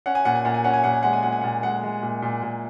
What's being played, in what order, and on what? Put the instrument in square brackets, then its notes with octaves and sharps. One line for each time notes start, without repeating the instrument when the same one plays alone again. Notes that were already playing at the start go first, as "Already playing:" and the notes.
[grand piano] C#4 F#5
G#5
A#2 F#5
G#5
A#2 F#5
G#5
C#4 F#5
G#5
A#2 F#5
G#5
G#3 F#5
G#5
A#2 F#5
G#5
A#2 F#5
G#3 F#5
G#3
A#2
A#2
A#2